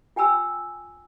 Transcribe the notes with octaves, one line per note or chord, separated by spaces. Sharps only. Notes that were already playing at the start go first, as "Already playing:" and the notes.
F4 G5 G#5 B5 E6